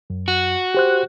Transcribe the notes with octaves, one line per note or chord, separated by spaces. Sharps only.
F#2
F#4
G4 C5 F#6